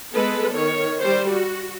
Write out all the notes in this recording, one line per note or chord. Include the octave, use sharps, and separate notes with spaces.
G#3 B3 A4 B4
D#3 C#5
G3 C5
F#4